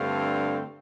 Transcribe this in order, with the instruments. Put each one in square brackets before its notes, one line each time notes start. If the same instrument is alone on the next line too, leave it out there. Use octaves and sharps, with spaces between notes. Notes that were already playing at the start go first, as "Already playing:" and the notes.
Already playing: [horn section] G2 D3 A3 C4 F5